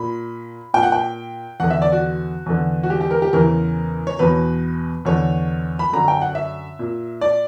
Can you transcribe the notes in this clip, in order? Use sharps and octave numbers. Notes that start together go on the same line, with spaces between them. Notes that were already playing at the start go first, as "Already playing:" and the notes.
Already playing: A#2 B5
A#2 G5
F#5
G5
E2 D3 F#5
E5
D5
F#4
E2 D3
F#4
G4
G4
A#4
G4
E2 C#3 E3 A#4
C#5
E2 B2 B4
E2 D3 C#5
B5
F#2 D3 A#5
G5
F#5
E5
A#2
D5